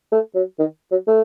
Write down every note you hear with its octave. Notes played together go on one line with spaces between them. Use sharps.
A3
F#3
D#3
F#3
A3